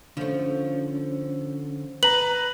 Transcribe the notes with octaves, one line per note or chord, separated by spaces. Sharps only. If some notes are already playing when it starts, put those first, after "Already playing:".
D3 F3 A3 C#4
B4 A#5 F#7